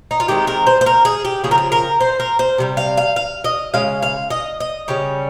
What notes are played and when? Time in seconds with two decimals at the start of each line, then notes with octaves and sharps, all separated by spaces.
0.11 D#4
0.20 F4
0.28 D#3 G#3 C4 G4
0.47 A#4
0.67 C5
0.81 C5
0.86 A#4
1.05 G#4
1.25 G4
1.44 C#3 F3 C4 G#4
1.51 A#4
1.58 G#4
1.72 A#4
2.00 C5
2.20 A#4
2.39 C5
2.58 C3 D#3 G3
2.77 F5
2.97 F5
3.16 F5
3.44 D#5
3.74 C#3 G#3 C#4 F5
4.02 F5
4.30 D#5
4.60 D#5
4.88 C#3 G3 C#4